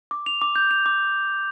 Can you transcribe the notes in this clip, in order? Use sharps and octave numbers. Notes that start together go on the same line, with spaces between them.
D6
F7
D6
G6
F7
D6